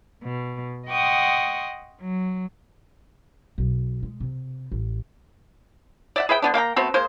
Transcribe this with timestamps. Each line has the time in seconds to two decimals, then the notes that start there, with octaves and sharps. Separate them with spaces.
0.23 B2
0.87 D#5 F#5 G5 C6 C#6 D#6
1.99 F#3
3.58 B1
4.03 G#3
4.20 C3
4.72 A1
6.16 D5 E5 F#5
6.29 G#4 B4 E5 G5
6.42 D3 B3 D4
6.54 A#3 F5 G5 A#5
6.76 A3 B3 C4 F#4
6.94 G#3 A#3 C5